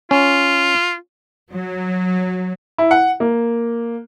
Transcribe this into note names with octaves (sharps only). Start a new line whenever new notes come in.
C#4 F4
F#3
E4
F#5
A#3